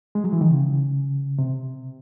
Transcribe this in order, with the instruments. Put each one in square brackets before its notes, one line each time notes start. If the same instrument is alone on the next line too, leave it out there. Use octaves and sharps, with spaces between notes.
[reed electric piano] G#3
F#3
E3
D#3
C#3
C3